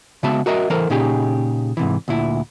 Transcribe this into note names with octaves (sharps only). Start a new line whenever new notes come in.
C#3 G#3 B3 F#4 E5 A5
F#4 A#4 D#5 E5
E3 A4 A#4 C5
A#2 C#3 D#4 G4 G#4
G#2 C3 E3
D2 A#2 E4